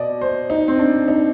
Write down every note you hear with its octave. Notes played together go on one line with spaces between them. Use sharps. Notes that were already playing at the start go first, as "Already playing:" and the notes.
Already playing: B2 D5 D#5
C5
D#4
C4
D4
D#4